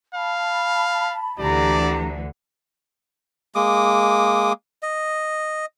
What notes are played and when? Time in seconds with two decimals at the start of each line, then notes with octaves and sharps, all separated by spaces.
0.15 F5 A5 B5
1.39 D2 D3 E3 G4 D5 A#5
3.55 G#3 A#3 D6 D#6
4.83 D#5